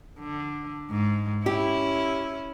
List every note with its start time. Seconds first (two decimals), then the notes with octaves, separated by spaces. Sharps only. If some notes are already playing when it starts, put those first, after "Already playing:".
0.19 D3
0.90 G#2
1.46 C#4 E4 G4